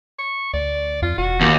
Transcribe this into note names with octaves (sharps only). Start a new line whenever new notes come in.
C#6
D2 D5
F2 F4
E1 F#4
D#2